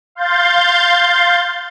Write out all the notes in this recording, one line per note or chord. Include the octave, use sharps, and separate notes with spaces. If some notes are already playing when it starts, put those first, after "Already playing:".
F5 C6 G6 A6